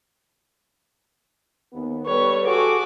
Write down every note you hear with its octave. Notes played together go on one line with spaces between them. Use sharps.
D#2 B3
G3 A4 B4 C#5
F#4 G#4 A4 D6